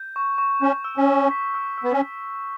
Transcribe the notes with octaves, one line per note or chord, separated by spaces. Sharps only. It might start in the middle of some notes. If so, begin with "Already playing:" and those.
Already playing: G6
C#6
C#6
C#4 G6
E6
C#4
E6
B6
E6
E6
B3
C#4